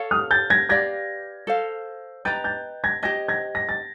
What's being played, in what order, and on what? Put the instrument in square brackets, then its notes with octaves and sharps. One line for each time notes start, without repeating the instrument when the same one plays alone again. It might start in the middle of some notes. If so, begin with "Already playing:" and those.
Already playing: [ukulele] A4 C#5 F5
[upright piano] D#6 F6
G6 A6
G#6 A#6
[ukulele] G4 B4 D5 F5 [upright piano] G#6 A#6
[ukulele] A4 C5 F5
[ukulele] B4 D#5 G5 A#5 [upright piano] G6 A6
[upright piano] G6 A6
G#6 A#6
[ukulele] G4 C5 D#5 [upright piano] G#6 A#6
[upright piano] G#6 A#6
A#6
A6